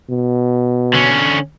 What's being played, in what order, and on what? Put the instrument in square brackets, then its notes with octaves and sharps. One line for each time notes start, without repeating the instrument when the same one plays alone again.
[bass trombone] B2
[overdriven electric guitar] D3 C#4